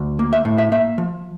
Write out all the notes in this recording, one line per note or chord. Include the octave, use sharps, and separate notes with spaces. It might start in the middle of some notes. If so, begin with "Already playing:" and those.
Already playing: D2
A#3
E5
A2
E5
A#3 E5
F3